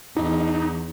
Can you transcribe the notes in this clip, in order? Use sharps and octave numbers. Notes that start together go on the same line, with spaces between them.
E2 D#4